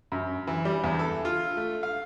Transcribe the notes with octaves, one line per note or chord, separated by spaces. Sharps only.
F#2
E3
G3
E2
A4
F4
A3
F5